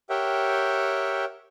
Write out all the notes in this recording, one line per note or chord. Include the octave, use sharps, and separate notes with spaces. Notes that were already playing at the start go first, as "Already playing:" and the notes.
G4 A#4 C#5 E5 F#5 G5